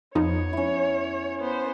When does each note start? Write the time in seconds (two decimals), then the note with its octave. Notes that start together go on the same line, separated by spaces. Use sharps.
0.15 F2 F3 B3 D#4 C#5
0.53 C#4 E4
1.40 B3 C5